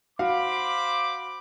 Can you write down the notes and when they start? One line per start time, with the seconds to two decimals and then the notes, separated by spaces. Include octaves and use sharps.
0.19 F#4 C5 F5 B5 D6